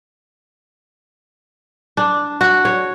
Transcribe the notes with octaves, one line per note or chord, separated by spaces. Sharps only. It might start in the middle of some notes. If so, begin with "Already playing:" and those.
D4
F#4
C#5